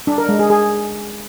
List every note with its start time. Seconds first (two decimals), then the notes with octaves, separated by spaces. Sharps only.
0.07 D4
0.18 A#4
0.29 G#3
0.39 G#4
0.50 G#4